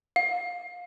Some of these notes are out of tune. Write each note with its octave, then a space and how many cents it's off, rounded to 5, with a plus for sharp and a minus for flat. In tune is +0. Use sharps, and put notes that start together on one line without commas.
F5 +25